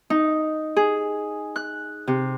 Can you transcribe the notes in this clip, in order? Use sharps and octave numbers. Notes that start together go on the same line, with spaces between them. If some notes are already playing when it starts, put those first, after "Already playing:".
D#4
G#4
F#6
C3